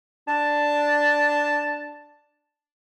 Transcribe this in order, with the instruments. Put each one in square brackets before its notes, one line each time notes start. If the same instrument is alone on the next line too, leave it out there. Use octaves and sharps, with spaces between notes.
[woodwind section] D4 A5